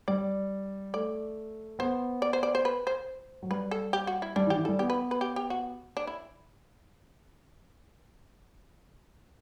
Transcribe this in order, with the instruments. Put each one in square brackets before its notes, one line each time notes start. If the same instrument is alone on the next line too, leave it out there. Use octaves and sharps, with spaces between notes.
[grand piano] G3 [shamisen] D5
[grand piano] A3 [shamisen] D5
[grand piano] B3 [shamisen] C5
[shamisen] D5
C5
D5
C5
B4
C5
[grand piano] F#3
[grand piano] G3 [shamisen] B4
[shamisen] A4
G4
F#4
E4
[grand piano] G3 [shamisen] D4
[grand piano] E3
[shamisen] G4
[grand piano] E3
[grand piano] G3 [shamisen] A4
[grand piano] B3 [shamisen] G4
[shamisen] B4
B4
G4
G4
F#4
D4
E4